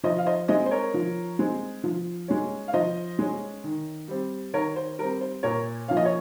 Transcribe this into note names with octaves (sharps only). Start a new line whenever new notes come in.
F3 C5 D#5
F5
C5 D#5
G#3 C4 C5 D#5
C5
A#4 C#5
F3
G#3 C4
F3
G#3 C#4
F5
F3 C5 D#5
G#3 C#4
D#3
G3 C4
D#3 A#4 C#5
C5
G3 C4 A#4
C5
A#2 A#4 C#5
F3 A#3 C#4 F5
D#5
C#5